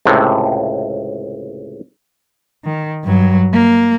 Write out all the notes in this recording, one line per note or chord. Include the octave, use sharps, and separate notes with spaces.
C#2 A2 C3
D#3
G2 F#3
A#3